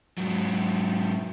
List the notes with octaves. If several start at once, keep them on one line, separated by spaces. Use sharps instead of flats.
G#2 F#3